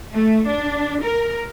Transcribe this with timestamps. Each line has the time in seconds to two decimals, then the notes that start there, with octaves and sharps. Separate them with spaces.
0.12 A3
0.47 D4
1.03 A#4